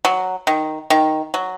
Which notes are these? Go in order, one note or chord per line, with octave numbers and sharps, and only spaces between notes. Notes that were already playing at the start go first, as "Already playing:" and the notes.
F#3
D#3
D#3
F#3